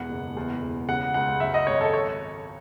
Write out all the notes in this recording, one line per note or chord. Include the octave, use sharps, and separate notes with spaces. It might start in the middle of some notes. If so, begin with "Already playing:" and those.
Already playing: E1 E2 F#5
F#1
E2
E1
C#3 F#5
C#2 F#5
F#2 E5
D#5
G#1 C#5
A4
C#5